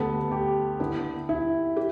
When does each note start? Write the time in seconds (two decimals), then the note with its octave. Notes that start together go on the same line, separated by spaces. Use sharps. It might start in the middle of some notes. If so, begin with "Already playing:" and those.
Already playing: D2 D3 A3 B3 G4
0.31 G4
0.80 D3 B3 E4
1.29 E4
1.77 G4